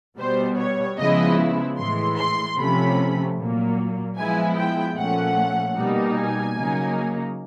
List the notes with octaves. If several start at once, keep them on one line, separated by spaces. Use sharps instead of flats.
B2 G3 B3 C5
C#5
C#3 F3 G#3 B3 E4 D#5
A2 E3 G#3 C6
C6
C3 F3 A3 C#4 B5
A#2 F#3 A#3
F3 G#3 B3 E4 G#5
G5
A#2 F3 A3 C#4 F#5
B2 G3 A#3 D#4
G#5
C#3 F#3 A#3 D#4